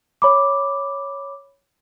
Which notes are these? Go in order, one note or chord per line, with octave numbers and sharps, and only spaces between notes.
C#5 B5 D6